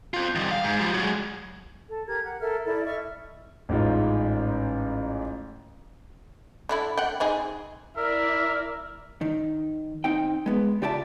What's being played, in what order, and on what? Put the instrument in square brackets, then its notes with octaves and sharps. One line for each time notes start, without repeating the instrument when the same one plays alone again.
[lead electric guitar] C4 F4
D#3 G3
F5
G#2
F3 G3
F#3 G#3
[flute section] A4
G4 A#4 G#6
F#5
A4 A#4 E5 F6
E4 A4 D5 B5
D#5 E5 C#6 F6
[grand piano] A1 G#2 F4
[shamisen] D3 A3 E4
F#5 G5
C4 D#4 G#4
[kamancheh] E4 D5 [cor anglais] A#4 [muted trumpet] E5
[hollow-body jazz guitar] D#3
C4 D#4 G5
G#3 B3
C#3 F4 G4 D5 E5 A5